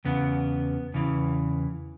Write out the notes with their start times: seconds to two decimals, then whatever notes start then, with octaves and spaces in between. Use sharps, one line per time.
0.05 E2 C#3 B3
0.94 E2 C#3 E3